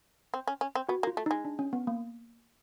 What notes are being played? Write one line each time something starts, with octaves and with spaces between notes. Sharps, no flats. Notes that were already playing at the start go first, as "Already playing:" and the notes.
C4
C#4
C#4
C4
B3 F#4
A#3
F4
A3
G#3 D#4
D4
C#4
B3
A#3